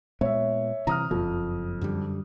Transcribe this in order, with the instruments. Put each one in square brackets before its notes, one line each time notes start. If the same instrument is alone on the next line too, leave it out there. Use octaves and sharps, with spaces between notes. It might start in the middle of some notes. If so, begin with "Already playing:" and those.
[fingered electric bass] A#2 G#3 B3 [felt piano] C#5 E5
[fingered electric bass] C3 E3 [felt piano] A#5 D#6 F6
[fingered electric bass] F#1 [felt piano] F2
[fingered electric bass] F#2 D3 G3